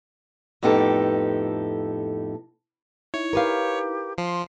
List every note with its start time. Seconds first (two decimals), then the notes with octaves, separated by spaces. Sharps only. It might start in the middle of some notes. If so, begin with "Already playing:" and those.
0.63 F2 A2 B3 D#4 G4 A4
3.14 D#4 E4 C#5
3.33 G4 A#4 B4 F5
4.18 F3 C6 C7